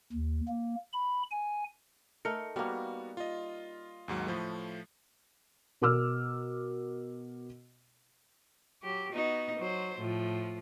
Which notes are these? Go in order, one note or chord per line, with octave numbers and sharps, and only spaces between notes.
D#2
A#3
B5
G#5
A3 D#4 A#4 C#7
G3 A#3 B3 F#4
F4 D#5
D#2 G#2 F#3
A2 F3 A3
B2 A#4 D6 E6 F6
F#3 G4
B3 D#4 F#4
F#3 C5
A2 F3